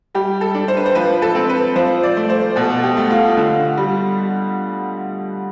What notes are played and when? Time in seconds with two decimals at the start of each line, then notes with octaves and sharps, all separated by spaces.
0.15 G3 G4
0.41 A4
0.54 D4
0.68 C5
0.77 B4
0.86 C5
0.95 F3 B4
1.22 A4
1.35 C4
1.49 B4
1.76 F3 C5
2.03 D5
2.17 A3
2.30 C5
2.56 B2 A4
2.83 G4
2.97 A3
3.11 F4
3.37 D3 F4
3.77 G3